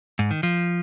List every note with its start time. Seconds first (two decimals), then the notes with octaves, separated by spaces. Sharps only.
0.19 G#2
0.31 D#3
0.43 F3